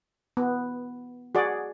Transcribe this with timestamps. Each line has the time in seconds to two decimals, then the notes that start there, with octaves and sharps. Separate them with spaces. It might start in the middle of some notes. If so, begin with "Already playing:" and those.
0.37 B3
1.35 F#4 G#4 D5